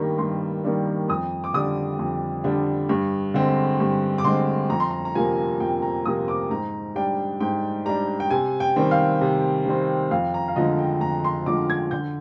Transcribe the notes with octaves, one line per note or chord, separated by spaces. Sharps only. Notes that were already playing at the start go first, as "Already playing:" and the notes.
Already playing: G2 D#3 G3 A#3 D4 A#5
G2 C6
D#3 G3 A#3 D4
F2 D#6
D6
D3 G3 D4 D#6
F2
D3 G3 D4
G2
D3 G#3 C4
G2
D6
D3 G#3 C4 C6
F2 A#5
C6
A#5
A#5
C3 F3 A#3 G#5
F2 G5
A#5
C3 F3 A#3 D#6
D6
G#2 A#5
G3 D4 G5
G#2 G5
G3 D4 A#5
G5
C3 G#5
G5
D#3 G3 C4
F5
C3
D#3 G3 C4
F2 F5
A#5
F5
D3 F3 G#3 D#5
G5
F2 A#5
C6
D3 F3 G#3 D6
G#6
D3 G6